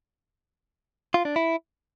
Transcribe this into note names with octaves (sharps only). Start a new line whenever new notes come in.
F4
D4
E4